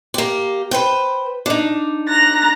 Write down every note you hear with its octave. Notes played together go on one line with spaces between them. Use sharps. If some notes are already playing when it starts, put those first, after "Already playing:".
A#3 G4
B4 C5 G5
D4 D#4
A#5 F#6 A#6